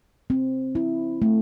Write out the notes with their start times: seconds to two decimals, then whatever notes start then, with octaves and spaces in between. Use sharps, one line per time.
0.30 C4
0.75 E4
1.22 A3